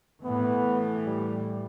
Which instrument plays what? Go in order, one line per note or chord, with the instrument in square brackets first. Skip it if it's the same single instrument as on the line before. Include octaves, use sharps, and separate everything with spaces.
[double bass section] A2 E3 A3 [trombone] B3
[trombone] G3